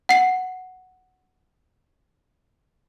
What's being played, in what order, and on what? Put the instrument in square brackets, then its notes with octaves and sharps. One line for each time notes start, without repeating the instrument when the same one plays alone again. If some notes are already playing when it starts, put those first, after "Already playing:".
[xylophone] F#5 C7